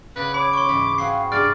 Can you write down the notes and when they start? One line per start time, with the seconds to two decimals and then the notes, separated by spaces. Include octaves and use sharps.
0.16 C#3 B4 D5 F#5
0.34 C#5 B5 D6
0.53 C6 C#6
0.69 G#2 E3 C#4 B5
0.98 C4 F#4 G#4 F5 C7
1.32 G2 C3 D4 G#4 D5 F6